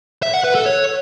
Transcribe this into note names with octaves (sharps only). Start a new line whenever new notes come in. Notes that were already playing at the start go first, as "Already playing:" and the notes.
E5
F#5
B4
A4
C#5